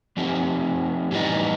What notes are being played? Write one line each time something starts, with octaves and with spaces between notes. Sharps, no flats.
F3 A3 C4 D#4 G4
A2 E3 G3 B3 D#4